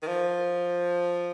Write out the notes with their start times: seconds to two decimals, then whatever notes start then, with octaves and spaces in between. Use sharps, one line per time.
0.02 D#3
0.07 F3